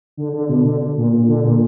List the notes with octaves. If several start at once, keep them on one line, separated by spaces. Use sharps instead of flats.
D3
D3
B2
D3
A#2
A#2
D3
A#2